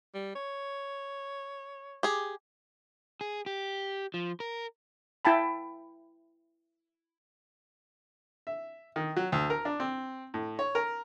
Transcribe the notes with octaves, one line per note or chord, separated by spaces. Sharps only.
G3
C#5
G4 G#4
G#4
G4
F3
A#4
E4 G5 A5 B5
E5
D#3
F#3
D2
A#4
D4
C4
A2
C#5
A#4